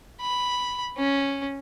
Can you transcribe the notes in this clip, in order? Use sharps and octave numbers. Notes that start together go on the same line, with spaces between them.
B5
C#4